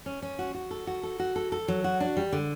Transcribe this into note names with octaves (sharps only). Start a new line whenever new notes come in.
C#4
C#4
F#4
F#4
A4
F#4
A4
F#4
A4
A4
F#3
F#4
D4
G3
D3